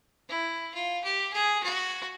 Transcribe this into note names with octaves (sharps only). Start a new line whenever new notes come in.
E4
F4
G4
G#4
F#4